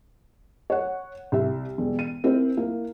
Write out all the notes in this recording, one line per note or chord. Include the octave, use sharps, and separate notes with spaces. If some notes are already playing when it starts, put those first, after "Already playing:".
C#5 F#5
C2 E5
E1
D#7
C4 E4 A#4 C5
A#3 E4